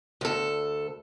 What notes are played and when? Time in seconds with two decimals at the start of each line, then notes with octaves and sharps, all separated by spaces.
0.21 D2 A4